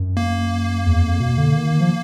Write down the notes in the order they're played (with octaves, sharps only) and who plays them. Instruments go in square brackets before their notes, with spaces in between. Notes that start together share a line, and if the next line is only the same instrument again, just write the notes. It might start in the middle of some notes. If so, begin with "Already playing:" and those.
Already playing: [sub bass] F#2
[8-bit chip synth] A#3
[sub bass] E2
F2
B2
D3
D#3
F3